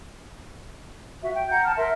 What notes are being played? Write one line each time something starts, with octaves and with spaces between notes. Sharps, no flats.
F#4 E5
G5
F#5 A#5 G6
A5 F6
A#4 E5 C6